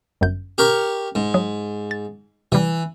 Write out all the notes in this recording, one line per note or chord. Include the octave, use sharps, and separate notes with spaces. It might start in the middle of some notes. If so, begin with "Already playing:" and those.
G1 F#2 G6
G4 A#4 C#6
G#2
F#3 D#6
A6
C3 E3 G3